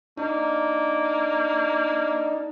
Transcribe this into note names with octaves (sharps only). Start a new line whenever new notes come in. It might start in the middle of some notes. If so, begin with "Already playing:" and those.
A#3 D4 D#4